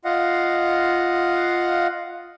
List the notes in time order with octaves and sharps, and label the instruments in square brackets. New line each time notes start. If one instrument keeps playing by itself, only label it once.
[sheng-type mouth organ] F4 D#5 F5 F#5